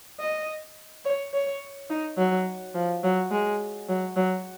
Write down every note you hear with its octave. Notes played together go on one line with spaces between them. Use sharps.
D#5
C#5
C#5
D#4
F#3
F3
F#3
G#3
F#3
F#3